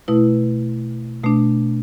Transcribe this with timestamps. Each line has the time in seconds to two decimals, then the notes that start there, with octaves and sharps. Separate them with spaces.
0.08 B2 A3 E4 B4
1.23 B2 A3 D4